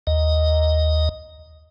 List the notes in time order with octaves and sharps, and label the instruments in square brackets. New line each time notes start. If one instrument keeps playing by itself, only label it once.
[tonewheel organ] D#2 D#5